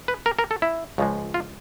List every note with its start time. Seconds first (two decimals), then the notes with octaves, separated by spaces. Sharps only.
0.08 B4
0.26 A#4
0.39 A#4
0.51 A4
0.62 E4
0.98 C#2 C#3 F3 G#3
1.34 F4